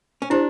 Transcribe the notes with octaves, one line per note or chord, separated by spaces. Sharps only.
C#4
D4 E4 G4 C5